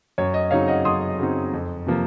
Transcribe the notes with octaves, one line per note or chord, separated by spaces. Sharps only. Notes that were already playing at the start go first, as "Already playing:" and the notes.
F#2 C#5
D#5
C#3 F#3 C4 D#4 C#5 F5
D#5 F#5
F#2 C6 D#6
C#3 F#3 C4 D#4
F2
C3 F3 A#3